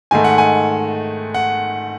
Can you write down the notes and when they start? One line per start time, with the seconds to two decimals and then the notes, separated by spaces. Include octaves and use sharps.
0.11 G#2 D#3 A3 G#5
0.24 F#5
0.38 G#5
1.34 F#5